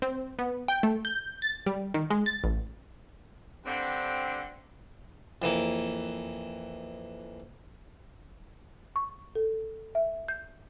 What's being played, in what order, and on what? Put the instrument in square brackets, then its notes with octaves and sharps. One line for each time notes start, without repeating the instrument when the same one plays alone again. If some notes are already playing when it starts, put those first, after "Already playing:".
[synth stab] C4
B3
G5
A3
G6
A6
G3
D#3
G#3
A6
A1
[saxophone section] G2 D3 C4
[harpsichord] F2 E3 A#3
[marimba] C#6
A4
E5
G6